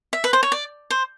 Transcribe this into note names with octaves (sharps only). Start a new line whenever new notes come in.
E5
B4
C5
C#5
D5
C5